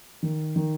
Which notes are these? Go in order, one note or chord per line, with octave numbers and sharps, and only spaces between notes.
D#3
D#3